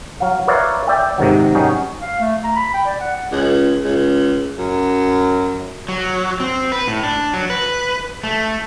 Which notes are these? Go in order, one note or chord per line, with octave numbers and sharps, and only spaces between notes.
F#3 F5
A#4 B4 C#5 D5 E5 F5
D5 E5 G5
G#2 C3 D#3 F#3
F#3 G3 C#4 D#4
F5
A3
A#5
B5
G5
D5
F#5
C#2
C#2
F#2
F#3
C4
B4
A2
D4
F#3
B4
A3